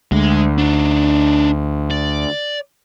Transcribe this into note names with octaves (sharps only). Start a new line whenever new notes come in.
D2 G#3
D4 D#4
D5